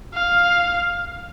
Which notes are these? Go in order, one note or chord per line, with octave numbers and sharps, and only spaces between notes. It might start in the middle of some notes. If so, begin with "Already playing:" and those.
F5